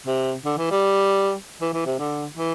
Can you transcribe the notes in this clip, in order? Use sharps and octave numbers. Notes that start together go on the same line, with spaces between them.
C3
D3
E3
G3
E3
E3
C3
D3
E3